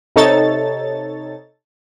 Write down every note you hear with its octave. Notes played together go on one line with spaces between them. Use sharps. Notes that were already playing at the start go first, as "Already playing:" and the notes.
C3 D#4 A4 C#5 A6